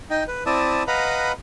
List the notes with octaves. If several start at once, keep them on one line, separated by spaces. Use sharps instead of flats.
D#4 D#5 G5
B4
C4 E4 D5 E5 A5 D#6
B4 D#5 F5 F#5 A#5 B5